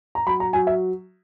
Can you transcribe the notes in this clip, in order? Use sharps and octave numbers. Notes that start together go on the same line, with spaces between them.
A#5
F#3 B5
A#5
F#3 G#5
E5